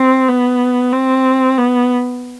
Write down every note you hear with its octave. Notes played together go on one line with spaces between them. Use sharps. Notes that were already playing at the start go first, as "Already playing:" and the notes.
Already playing: C4
B3
C4
B3